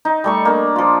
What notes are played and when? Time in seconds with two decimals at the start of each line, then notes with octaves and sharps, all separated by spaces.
0.05 D#4
0.24 G3 A3 C#6
0.45 A#3 D4
0.76 F3 F4